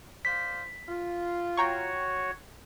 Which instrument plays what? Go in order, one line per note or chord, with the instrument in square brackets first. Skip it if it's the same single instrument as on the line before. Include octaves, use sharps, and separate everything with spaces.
[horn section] C5 D5 F5 [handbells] B6
[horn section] F4
[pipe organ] F#4 C#5 [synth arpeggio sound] G5 A#5 C#6